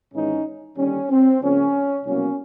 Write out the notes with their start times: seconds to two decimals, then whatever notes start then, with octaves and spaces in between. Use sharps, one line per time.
0.13 G#1 G#2 E3 G#3 C#4 D#4
0.77 D#2 D3 G3 C#4
1.10 C4
1.41 C#2 C#3 F3 A#3 C#4
2.05 C2 B2 F#3 A#3 C#4